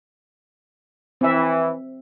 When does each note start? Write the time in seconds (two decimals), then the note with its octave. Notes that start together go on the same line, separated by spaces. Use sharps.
1.21 E3 C4 E5